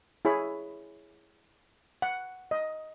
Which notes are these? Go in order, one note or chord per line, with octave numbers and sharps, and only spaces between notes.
E4 G#4 C#5 B5
F#5
D#5